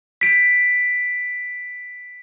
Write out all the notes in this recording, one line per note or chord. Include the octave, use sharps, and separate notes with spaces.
B6 D7